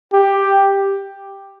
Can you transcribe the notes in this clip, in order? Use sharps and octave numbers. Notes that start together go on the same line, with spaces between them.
G4